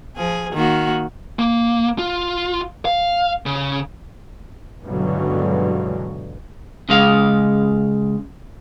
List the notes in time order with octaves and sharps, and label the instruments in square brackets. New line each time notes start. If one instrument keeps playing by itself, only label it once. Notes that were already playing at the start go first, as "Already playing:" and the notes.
[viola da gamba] F3 G#4
D#3 A#3 F#4
[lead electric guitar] A#3
F4
F5
C#3
[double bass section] C#2 G2 B2 D3 E3 F#3
[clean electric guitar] C#3 G#3 F5